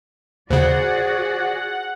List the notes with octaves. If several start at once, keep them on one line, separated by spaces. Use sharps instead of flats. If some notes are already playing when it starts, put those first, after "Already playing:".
D#2 C#3 F#4 G#4 C5 D5 F#5